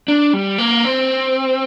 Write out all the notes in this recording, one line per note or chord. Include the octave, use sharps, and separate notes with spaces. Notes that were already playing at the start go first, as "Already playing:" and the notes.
D4
G3
A#3
C4